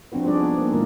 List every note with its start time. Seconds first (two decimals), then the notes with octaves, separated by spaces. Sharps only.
0.12 F3 C4 D4 F#4 B4
0.26 G3 C4 D4 D#4 G#4 D5
0.41 B3
0.58 A#3
0.71 A#2 D#3 G#3 E4 A#4